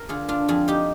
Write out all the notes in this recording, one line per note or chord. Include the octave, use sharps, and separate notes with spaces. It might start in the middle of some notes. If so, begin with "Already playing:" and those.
Already playing: A#4
D3 F4 G#4
D4 F4
F2 F4 G#4
D#4 G4